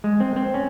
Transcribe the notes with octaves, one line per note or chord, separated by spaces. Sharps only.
G#3
C4
C4
C#4